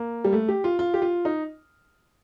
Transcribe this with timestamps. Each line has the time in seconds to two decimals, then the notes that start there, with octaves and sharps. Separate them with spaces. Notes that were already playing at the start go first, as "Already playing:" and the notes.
Already playing: A#3
0.24 G3
0.33 A3
0.48 G4
0.64 F4
0.79 F4
0.94 G4
1.02 F4
1.25 D#4